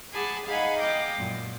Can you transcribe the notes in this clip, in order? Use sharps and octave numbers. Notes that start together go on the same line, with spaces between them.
G#4 F#5 G#5 A5 B5 D6
D#4 G#4 F5 F#5 G#5 B5
D#5 F5 G5 D6
F#2 A#2